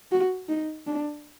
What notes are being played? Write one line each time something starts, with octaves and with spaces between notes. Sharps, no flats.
F#4
D#4
D4